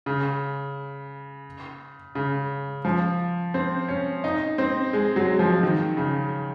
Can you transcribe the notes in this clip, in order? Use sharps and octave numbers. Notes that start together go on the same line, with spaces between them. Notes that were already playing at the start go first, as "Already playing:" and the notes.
C#3
C#3
F3
C4
C#4
D#4
C4
G#3
F#3
F3
D#3
C#3